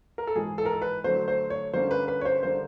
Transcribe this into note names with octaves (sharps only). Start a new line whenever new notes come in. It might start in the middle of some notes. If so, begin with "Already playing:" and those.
A#4
A4
G#2 E3 G#3 G#4
A4
A#4
A4
B4
D3 F#3 A3 C5
C5
C#5
D3 G3 A#3 C#4 C5
B4
B4
C#5
C5
D3 G3 A#3 C5